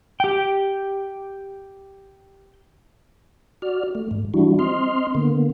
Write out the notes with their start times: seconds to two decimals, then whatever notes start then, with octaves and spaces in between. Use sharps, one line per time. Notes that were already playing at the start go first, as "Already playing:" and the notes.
0.20 G4 G5
3.62 F#4 D5 F6
3.95 A3
4.11 G#2
4.34 E3 G3 D4 E4 F#4
4.59 C4 D#5 C6 F6
5.15 D3 A#3 B3